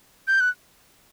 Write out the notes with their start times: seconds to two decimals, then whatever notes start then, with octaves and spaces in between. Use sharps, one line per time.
0.28 G6
0.40 F#6